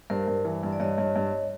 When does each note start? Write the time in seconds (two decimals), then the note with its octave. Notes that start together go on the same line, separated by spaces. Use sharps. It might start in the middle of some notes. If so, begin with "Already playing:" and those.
0.10 G2 A#4 C5
0.28 G2
0.45 E3
0.63 G2
0.73 D5
0.80 G2 C#5 D#5
0.98 G2
1.16 G2